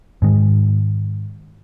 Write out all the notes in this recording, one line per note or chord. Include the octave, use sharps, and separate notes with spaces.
G#2 D#3 G#3